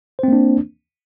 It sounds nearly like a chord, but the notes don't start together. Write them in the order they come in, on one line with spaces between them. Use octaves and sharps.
C5 C4 A#3 D4